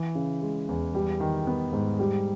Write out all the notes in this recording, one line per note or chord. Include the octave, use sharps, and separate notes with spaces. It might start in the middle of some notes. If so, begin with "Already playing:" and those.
Already playing: E3
C#3
G#3
E2
G3
D#3
B3
G#2
G3